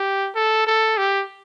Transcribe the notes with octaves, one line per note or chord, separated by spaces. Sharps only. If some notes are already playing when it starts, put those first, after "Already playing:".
Already playing: G4
A4
A4
G4